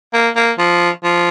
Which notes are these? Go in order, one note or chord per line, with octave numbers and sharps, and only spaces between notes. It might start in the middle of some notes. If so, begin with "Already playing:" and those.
A#3
A#3
F3
F3